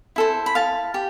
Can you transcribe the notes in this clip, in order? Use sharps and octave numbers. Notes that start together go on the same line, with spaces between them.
E4 A4 C5
B5
F5 A5
G4